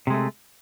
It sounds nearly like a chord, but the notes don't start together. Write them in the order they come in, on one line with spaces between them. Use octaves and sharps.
C3 G#3 A3